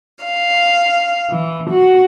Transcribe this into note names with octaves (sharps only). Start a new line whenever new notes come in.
F5
E3
F#4